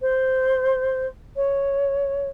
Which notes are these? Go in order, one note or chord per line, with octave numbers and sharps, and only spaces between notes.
C5
C#5